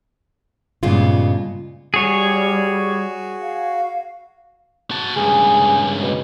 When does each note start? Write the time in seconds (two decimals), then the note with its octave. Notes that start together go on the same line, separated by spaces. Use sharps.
0.83 G2 A#2 C#3 G#3 B3 F4
1.94 G3 F#4 G#4 C#5
3.42 F5
4.91 F#4 A5
5.16 C#2 G2 G#4
6.02 B2